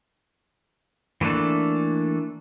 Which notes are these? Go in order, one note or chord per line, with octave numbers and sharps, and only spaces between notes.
E3 A3 A#3 D4 A4